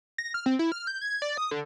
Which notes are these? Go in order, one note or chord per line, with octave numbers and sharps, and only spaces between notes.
A#6
F6
C4
E4
F6
G6
G#6
D5
D#6
D3